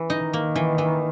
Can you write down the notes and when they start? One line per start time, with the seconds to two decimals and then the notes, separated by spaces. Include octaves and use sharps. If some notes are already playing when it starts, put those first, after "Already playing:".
Already playing: E3
0.10 D#4
0.21 D#3
0.33 A#3
0.55 E3
0.78 E3